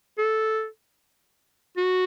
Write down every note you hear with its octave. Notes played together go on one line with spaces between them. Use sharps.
A4
F#4